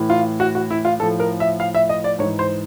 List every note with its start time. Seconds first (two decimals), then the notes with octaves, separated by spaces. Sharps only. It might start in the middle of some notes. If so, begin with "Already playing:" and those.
Already playing: A2 E3
0.10 F4
0.40 F#4
0.55 F#4
0.70 E4
0.85 F4
0.99 A2 A4
1.03 F3
1.20 A#4
1.40 E5
1.60 F5
1.75 E5
1.89 D#5
2.04 D5
2.19 G#2 E3 C#5
2.39 C5